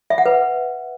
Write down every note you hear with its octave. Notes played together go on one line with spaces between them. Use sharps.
E5
F#5
B4